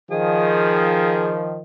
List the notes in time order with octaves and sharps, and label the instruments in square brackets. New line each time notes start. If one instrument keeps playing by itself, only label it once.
[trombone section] D#3 F3 [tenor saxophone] G#4